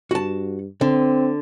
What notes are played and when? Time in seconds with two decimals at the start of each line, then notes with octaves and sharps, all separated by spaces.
0.11 G2 F#4 A5
0.81 D3 C4